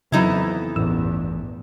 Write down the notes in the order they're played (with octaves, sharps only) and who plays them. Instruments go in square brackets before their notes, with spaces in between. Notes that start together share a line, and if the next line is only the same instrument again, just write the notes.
[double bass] F2 E3 [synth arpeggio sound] C#3 F#3 [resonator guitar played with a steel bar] B3 D#4 E4
[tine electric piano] A1 [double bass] E2 G2 [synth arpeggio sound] E6